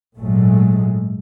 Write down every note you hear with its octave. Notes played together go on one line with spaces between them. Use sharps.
G#1 A#2 F#3 G#3 A3